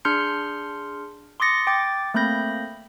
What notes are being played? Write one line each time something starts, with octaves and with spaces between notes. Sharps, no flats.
D4 G#4 C6 F6 G6 C#7
C6 D6 D#6 A6 A#6 C#7
G5 D6 A6
A3 A#3 C4 B5 G6 A#6